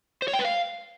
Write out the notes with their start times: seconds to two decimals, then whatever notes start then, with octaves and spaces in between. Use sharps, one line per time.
0.22 C5
0.28 C#5
0.33 G5
0.39 B4
0.45 F5